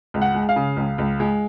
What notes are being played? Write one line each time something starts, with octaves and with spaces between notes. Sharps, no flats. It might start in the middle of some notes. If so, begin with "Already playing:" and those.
C#2
F#5
G#3
F5
C#3
C#2
C#2
G#3